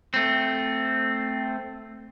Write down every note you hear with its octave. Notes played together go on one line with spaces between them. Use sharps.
A3 C4